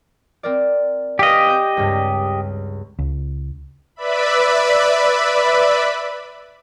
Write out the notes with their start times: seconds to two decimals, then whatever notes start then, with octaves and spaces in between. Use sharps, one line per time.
0.43 C4 A#4 D5
1.19 G4 B4 D#5 F5 G#5
1.47 C4 F#6 G6
1.77 C#2 G2 C#3
2.99 C#2
3.96 B4 D5 E5 B5